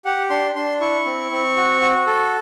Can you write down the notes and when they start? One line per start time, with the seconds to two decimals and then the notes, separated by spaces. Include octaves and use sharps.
0.05 G4 F#5
0.30 D4 C6
0.55 D4 C6
0.80 E4 C#6
1.05 C4
1.31 C4
1.57 F#4
1.81 F#4
2.07 A4